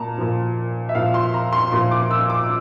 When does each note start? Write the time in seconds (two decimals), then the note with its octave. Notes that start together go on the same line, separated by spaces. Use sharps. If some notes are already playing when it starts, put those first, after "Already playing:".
Already playing: A#2 A5 A#5
0.18 A#2 F3
0.89 E5
0.95 A#2 F3 F5
1.14 C6
1.34 A#5
1.53 C6
1.72 A#2 F3 C6
1.91 D6
2.11 E6
2.30 D6